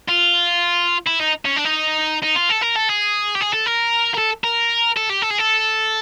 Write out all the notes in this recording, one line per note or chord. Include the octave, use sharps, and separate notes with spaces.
F4
E4
D#4
C#4
D4
D#4
D#4
F4
A4
A#4
A4
G#4
G4
G#4
A4
A#4
A#4
A4
A#4
A4
G4
A4
G#4
A4